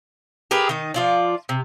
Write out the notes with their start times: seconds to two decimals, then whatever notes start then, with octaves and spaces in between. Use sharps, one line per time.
0.51 G4 G#4 A#4 B4
0.69 D#3 D#4
0.94 F3 F4 D5
1.49 C3